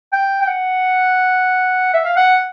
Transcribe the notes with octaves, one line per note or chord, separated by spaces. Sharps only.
G5
G5
F#5
E5
F5
F#5